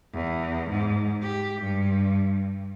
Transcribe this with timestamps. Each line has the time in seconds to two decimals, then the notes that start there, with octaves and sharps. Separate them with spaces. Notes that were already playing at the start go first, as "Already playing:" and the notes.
0.13 E2
0.70 G#2
1.22 G4
1.62 G2